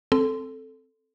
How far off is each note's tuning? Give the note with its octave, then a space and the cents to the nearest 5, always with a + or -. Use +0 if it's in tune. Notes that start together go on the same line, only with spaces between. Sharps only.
C4 +0 A4 +0 C6 -20